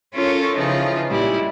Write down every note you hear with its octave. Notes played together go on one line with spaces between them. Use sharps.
C#4 F4 A4 A#4 C#5
C#3 E3 F3 D#4 F4
A#2 G3 G#3 E4